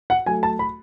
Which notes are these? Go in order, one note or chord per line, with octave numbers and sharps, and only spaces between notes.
F#5
F#3 A3 G#5
A5
B5